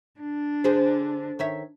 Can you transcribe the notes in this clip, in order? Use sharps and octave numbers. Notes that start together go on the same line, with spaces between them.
D4
D3 G#4 C5
D#3 C#5 E5